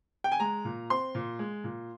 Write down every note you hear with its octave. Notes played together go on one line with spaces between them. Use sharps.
G5
G#5
G#3 A#5
A#2
C4 C6
A#2
G#3
A#2